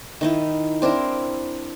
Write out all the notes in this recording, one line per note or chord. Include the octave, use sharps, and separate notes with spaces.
D#3 D#4 E4
C4 D4 E4 A#4